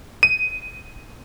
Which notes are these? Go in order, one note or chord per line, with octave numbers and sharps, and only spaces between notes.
D#7